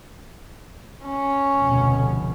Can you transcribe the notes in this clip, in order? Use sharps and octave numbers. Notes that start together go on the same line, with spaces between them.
C#4
F1 D2 B2